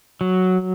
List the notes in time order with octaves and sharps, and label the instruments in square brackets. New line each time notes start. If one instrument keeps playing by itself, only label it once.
[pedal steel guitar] F#3